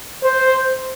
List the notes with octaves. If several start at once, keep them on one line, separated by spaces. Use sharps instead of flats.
C5